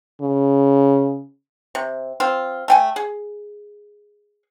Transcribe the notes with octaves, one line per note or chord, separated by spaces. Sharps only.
C#3
C3
C4 F4
A3 G5 G#5
G#4